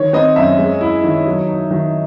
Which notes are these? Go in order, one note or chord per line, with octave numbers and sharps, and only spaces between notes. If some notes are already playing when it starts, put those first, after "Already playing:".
Already playing: D#3 C#5
C4 D#5
F#2 E5
G#3
E4
D#3
F#3
D#4
D#3